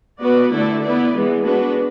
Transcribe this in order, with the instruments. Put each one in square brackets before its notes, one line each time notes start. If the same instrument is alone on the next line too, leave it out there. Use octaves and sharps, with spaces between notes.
[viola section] B3 F#4 B4 D5
D3 A3 E4 A4 D5
B3 E4 B4 D5
E3 G#3 B3
G#3 B3 D4 F#4 B4